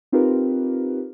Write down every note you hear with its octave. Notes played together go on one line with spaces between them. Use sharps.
C4 D#4 F4 G4 A#4 B4